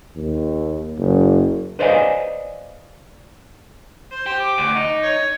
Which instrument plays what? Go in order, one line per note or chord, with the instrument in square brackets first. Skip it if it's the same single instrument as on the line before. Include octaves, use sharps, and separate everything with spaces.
[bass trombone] D#2
F#1
[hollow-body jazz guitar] B4 C5 D5 D#5 F5 G#5
[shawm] C5
[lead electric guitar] G4 [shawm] C5
[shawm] D6
[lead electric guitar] D2
D#4
[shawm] C#5